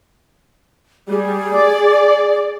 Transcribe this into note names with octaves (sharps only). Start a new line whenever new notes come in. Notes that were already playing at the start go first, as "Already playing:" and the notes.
G3 G#4
D5